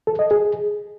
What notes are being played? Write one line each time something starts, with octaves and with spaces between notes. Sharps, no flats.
A4
D#5
G#4